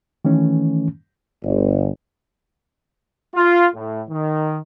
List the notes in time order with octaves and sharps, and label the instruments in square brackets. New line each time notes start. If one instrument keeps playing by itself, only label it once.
[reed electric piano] D#3 E3 A3 C#4
[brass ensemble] G1
F4
A2
D#3